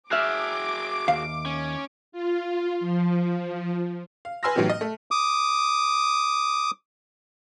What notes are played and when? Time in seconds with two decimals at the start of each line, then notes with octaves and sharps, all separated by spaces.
0.11 F#4 G#4 E5 D6 F6 F#6
1.08 D#2 F5
1.46 C#4
2.12 F4
2.80 F3
4.25 F5
4.43 B4 G#5 C6 E6 F6 A#6
4.55 A2 E3 F#3 B3 D#4 G4
4.70 D#5
4.81 A3
5.11 D6 D#6